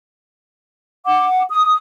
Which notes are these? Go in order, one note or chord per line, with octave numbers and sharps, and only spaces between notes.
F#5 D6
D#6